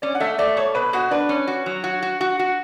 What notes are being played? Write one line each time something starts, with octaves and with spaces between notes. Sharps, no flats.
C#4 D5
F#5
A3 E5
A3 D5
B2 C#5
B2 B4
B2 F#4
D4 B4
C#4
F#4
F#3
F#4
F#4
F#4
F#4